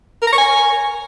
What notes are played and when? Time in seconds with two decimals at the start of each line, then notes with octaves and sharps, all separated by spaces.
0.22 A#4
0.27 A#5
0.33 C#6
0.38 G#5